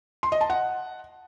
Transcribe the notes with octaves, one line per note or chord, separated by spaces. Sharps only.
C6
D#5
A5
F#5